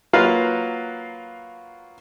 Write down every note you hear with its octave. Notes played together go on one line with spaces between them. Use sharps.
F#3 A#3 F4 B4 F5 F#5